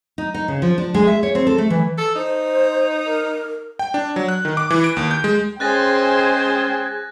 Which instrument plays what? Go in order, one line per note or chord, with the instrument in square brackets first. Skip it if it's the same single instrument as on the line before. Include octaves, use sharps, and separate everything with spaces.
[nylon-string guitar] D#4
D#4
C#3
F3
D4
G#3
E5
C#5
C4
A4
A3
E3
[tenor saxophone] A4
[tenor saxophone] D#4 [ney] C5
[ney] A#4
[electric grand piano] G5
D4
F#3
F#6
D#3
D6
E3
D7
D#2
G6
G#3
[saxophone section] G#3 C#4 [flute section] G#4 [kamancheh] C5 G5 [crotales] F#6 A6 A#6